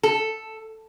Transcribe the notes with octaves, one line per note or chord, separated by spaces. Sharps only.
A4